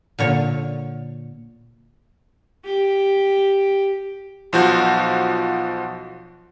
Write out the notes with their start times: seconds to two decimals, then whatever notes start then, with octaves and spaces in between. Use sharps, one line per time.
0.19 A#2 D3 C#5
2.64 G4
4.53 B1 F3 F#4 G6